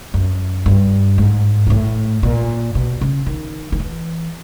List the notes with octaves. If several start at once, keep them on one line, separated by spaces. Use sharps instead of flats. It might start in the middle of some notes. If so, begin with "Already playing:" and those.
F#2
G2
G#2
A#2
A2
A#2
B2
C#3
D#3
D#3
E3